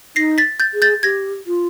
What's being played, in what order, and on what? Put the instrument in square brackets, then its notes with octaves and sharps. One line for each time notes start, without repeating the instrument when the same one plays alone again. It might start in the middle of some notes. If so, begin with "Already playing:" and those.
[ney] D#4 [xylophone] A#6 C7
[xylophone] A6 B6
G6 A6
[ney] G#4
[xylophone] G6 A6
[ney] G4 [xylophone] G#6 A#6
[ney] F4